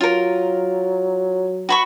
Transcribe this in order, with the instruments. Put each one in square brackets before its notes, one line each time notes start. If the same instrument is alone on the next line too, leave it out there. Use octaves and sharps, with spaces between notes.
[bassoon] F#3 [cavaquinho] F4 A#4
[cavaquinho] F#4 B5 C#6